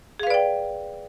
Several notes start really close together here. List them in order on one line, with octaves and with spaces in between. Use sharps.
G#4 F5 B4 D5 G5